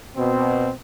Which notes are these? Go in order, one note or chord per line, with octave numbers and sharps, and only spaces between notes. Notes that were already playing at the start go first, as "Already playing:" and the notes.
B2 C4